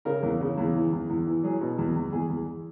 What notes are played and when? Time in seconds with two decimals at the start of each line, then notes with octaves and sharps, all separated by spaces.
0.05 C#3 A#4
0.23 E2
0.41 C#3
0.58 E2
0.74 E3
0.92 E2
1.10 E2
1.26 E3
1.43 F#3 G#4
1.61 B2
1.78 E2
1.96 E2
2.12 E2 G#4
2.30 E2